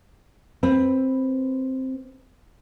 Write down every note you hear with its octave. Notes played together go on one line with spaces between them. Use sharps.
C4 B4